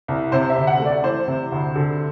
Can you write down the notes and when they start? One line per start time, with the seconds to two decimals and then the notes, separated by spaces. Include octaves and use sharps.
0.08 C2
0.32 C3 C5
0.50 E5
0.57 D2
0.67 F#5
0.80 A3
0.85 D5
1.04 E3 C5
1.27 C3
1.52 D2
1.76 D3